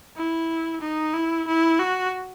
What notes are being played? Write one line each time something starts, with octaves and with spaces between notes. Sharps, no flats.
E4
D#4
E4
E4
F#4